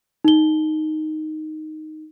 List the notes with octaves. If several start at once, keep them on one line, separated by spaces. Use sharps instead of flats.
D#4 G7